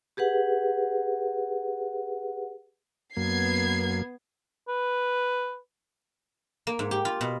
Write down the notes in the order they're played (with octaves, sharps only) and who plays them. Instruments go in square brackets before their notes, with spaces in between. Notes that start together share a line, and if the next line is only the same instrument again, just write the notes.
[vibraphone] G4 G#4 B4 F#5
[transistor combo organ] F#2 A#3 [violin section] B3 G#6 C7
[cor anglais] B4
[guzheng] A#3
G#2
G4
F4
B2